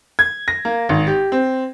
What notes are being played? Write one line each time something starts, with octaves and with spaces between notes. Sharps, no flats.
G#6
A#6
A#3
G#1
G4
C4